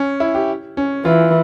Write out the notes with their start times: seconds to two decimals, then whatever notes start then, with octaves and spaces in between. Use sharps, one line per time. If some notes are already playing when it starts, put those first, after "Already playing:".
Already playing: C#4
0.20 E4
0.35 G4
0.77 C#4
1.05 E3 F4